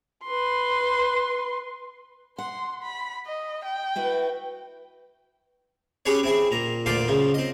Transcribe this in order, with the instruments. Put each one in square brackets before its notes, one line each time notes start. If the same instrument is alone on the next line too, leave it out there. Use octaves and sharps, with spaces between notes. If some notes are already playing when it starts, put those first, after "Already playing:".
[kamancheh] B4 C6
[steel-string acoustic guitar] F#5 [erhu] C6
[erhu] B5
D#5
G5
[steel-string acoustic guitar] E4 F#4 B4
[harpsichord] C#4 G4 G#4 B4 C#5
C4 E4 G#4
A#2 A#5
D2 A#2 F4 D5 G5 C6
F#2 C#3 F3
C4 D#5